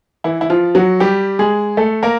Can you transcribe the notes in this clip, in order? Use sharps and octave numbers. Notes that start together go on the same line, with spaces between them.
E3 E4
E4
F3 F4
F#3 F#4
G3 G4
G#3 G#4
A3 A4
A#3 A#4